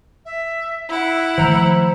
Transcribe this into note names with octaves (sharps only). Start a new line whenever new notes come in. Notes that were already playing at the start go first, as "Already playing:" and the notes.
E5
E4 F#5 E6
D#3 F3 A3 C5 A#5